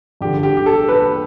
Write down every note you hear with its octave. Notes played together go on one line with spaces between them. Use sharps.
G2 D3 G4
G4
G4
A4
B4